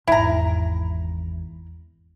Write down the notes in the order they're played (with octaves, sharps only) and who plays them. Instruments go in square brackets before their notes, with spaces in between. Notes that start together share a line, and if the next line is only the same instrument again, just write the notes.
[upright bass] G#1 E2 [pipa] E4 A#5